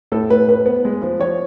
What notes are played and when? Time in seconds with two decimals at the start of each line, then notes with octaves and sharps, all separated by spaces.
0.12 A2 A4
0.30 A2 B4
0.48 A2 B4
0.66 B3
0.85 G#3
1.02 F3
1.20 F3 C#5